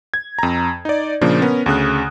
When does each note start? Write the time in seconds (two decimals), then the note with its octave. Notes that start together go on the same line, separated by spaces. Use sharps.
0.14 G#6
0.39 F2 A#5
0.85 D#4 D5
1.21 A#2 C#3 F3 A#3 D4
1.42 B3 C#4 A#4
1.66 D2 C#3 D#6 F#6